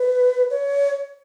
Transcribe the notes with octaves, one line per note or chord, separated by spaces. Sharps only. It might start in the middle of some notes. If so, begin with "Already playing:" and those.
Already playing: B4
C#5